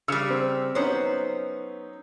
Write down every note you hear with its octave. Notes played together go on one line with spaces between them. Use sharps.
C#3 G3 E6 F6 C#7
C4
F#3 B3 C#4 D#4 C5